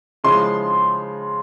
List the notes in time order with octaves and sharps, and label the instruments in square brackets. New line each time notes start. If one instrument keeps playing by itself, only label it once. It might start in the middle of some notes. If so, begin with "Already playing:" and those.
[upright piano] C#3 F3 G#3 C#4 E4 [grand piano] C6